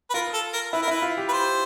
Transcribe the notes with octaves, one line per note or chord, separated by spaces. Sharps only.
B4
F4 A#4
A4
A#4
E4 B4
A#4
E4 B4
F4
G4
B4
C5